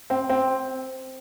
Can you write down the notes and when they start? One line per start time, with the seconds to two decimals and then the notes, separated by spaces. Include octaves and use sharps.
0.10 C4
0.29 C4